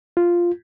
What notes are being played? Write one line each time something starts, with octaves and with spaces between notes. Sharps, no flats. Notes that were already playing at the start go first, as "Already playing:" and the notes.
F4